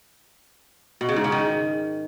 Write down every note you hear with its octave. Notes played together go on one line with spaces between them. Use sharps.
B2
C#3
G#2
C#3
D#3